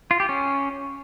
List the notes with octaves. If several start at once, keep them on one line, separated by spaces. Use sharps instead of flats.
F4
G4
C#4